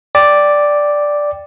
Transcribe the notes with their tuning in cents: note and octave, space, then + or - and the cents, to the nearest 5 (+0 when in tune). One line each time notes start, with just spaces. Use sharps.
D5 +0 G5 +0